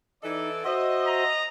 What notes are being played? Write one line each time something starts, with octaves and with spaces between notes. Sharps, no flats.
E3 D#4 A4 D5
F#4 C5 D#5 E5
A#5